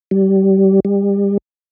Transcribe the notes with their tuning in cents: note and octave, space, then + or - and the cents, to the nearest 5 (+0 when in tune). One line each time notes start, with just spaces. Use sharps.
G3 -25
G3 +30